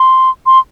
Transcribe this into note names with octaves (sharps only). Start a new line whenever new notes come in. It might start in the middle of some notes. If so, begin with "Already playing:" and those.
Already playing: C6
C6